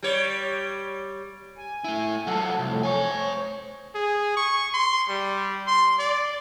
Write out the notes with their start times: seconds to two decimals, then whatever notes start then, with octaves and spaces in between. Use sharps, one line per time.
0.03 G3 C#5
1.58 G#5
1.84 A3 E4
2.27 F#3 F4 A4 F#5
2.58 C2 F2 A2
2.83 C5 C#5 G#5
3.95 G#4
4.37 C#6
4.74 C6
5.09 G3
5.67 C6
5.98 D5